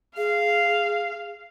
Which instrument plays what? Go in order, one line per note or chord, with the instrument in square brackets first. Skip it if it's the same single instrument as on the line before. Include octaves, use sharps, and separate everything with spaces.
[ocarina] G#4 [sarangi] F5